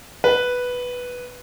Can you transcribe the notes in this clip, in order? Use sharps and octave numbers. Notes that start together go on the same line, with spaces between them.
B4